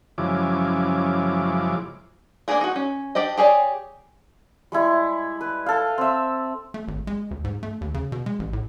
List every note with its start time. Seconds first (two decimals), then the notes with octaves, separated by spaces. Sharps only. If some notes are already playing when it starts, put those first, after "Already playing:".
0.18 F#2 C#3 F3 G#3 E4 D6
2.48 A#3 C#4 D4 G#4 A#4
2.61 D#4 F#4
2.76 C#4
3.15 D4 G4 C5 D#5
3.37 G4 G#4 C#5 D5
4.72 G3 G#3 E4
5.41 B4
5.66 A4 F5
5.98 C4 E5
6.74 A3
6.88 G#1
7.07 G#3
7.31 D2
7.44 G#2
7.63 A3
7.81 D#2
7.94 C#3
8.12 B2
8.26 G#3
8.39 A1
8.53 A2